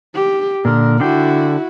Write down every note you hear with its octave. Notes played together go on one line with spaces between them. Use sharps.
G4
A#2 D3 A#4
D3 D4 E4 F#4 G5